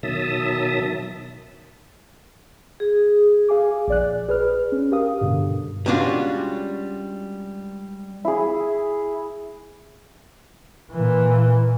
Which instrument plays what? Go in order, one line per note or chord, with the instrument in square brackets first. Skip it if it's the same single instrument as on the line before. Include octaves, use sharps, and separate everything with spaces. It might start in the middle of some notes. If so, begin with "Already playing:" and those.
[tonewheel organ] B2 D#3 F#3 E5 A5 D#6
[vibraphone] G#4
[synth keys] G#4 F5 G#5 D6
A#1 D5 F#6
G#4 B4 F6
C#4
G4 A#4 F5 D#6
G2 B2 D3
[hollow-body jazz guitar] G3 G#3 C#4 D4 F4 F#4
[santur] E4 G#4
[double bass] A#2 E3